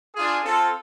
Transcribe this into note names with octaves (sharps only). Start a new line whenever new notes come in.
D4 F4 G#4
C4 F4 A4